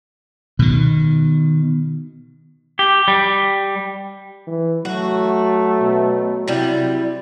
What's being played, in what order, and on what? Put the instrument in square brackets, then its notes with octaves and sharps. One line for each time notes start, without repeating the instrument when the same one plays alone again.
[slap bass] B2 D#3
[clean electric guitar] G4
G3
[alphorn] E3
[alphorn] F#3 [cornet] A3 [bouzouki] F#4
[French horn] B2
[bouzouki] C3 G3 [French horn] E4